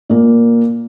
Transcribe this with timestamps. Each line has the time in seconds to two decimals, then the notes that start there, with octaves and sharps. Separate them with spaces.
0.10 A#2 A#3